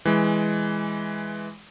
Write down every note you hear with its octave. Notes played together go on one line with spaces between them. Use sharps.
E3 G#3